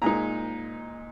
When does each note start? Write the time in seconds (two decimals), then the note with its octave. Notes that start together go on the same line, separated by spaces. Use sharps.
0.02 A#2 G#3 D#4 A#5